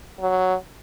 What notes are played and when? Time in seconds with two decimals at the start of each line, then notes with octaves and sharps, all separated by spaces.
0.20 F#3